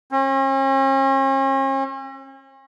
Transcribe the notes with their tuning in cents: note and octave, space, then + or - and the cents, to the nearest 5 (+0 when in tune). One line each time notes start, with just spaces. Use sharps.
C#4 -45